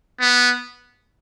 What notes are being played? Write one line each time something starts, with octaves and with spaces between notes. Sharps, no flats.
B3